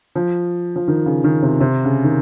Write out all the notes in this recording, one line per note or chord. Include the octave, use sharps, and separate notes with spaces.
F3
F3
D#3
C#3
D#3
C3
C3
C#3
D#3